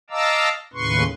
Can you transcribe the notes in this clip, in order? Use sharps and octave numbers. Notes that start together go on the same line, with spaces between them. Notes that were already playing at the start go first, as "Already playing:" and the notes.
D#5 F5 A5 A#5 D6 E6
D#2 A2 C#3 B4 C6 C#6